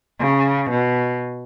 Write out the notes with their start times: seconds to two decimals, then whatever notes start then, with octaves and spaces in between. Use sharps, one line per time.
0.20 C#3
0.70 B2